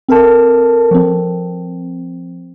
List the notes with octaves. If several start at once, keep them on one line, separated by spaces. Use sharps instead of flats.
C4 A4 A#4 A5
F3 C4